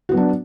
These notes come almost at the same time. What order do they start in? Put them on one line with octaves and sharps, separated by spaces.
F#4 B3 F#3 D4